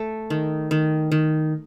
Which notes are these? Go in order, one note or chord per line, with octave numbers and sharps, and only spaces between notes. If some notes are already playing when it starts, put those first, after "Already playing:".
Already playing: A3
D#3
D#3
D#3